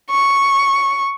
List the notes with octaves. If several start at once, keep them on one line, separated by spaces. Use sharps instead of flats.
C#6